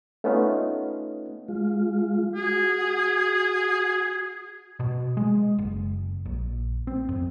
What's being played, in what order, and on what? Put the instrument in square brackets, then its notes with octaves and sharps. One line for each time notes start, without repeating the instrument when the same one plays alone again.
[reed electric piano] A3 B3 C#4 D#4 F4
[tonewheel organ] G#3 F4
[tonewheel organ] F#4 [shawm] G#4
[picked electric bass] B2
G#3
F#1
A#1
C4
F2